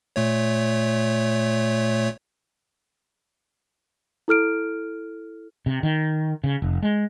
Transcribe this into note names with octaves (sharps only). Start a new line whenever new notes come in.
A#2 A3 C#5
E4 A4 F6 D7
C3
D#3
C#3
F1
G#3